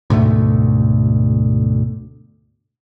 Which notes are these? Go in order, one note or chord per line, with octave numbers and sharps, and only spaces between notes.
D2 G#2 B2 A3